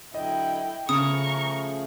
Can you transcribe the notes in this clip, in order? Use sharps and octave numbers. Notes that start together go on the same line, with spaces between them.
D3 F#3 E4 D#5 G5
C#3 F3 A3 G#4 A#5 C#6 D#6